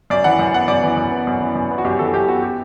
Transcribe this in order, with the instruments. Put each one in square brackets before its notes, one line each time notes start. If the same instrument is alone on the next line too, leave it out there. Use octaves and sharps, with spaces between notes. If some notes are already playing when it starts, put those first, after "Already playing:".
[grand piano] F#2 D5
E3 F#5
F#2
B3 F#5
F#2 D5
E3
F#2
B3
F#2
E3
F#2
B3
F#4
F#2 G4
E3 A4
F#2 G4
B3 F#4
G4